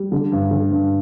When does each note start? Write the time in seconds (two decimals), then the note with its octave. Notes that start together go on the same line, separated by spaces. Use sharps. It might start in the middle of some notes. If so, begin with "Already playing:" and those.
Already playing: G3
0.12 D3
0.32 G2
0.51 D3
0.71 G2